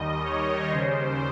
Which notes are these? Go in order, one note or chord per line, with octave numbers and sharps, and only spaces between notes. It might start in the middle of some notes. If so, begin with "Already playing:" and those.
Already playing: D#2 D#3 G3 D#5
C#5
D#2 C#3 G3 C5